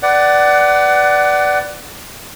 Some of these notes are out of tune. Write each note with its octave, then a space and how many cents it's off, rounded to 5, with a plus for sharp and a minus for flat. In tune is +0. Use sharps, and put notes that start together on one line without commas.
B4 +5 D5 +0 F#5 +25